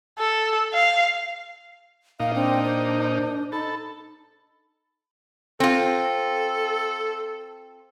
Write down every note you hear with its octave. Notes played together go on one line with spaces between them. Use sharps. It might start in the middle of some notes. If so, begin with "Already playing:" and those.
A4
F5
A#2 D#4 F5
C4 D4
C5
D#4 A4 B5
C4 F4 A4